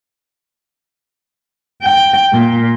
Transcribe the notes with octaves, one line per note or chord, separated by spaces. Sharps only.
G5
A#2